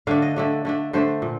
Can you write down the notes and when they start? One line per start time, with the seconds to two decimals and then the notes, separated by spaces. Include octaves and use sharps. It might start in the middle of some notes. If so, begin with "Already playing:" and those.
0.07 D3 A3 D4 F5
0.22 D#5
0.36 D3 A3 D4
0.65 D3 A3 D4
0.93 D3 A3 D4 C5
1.22 A#2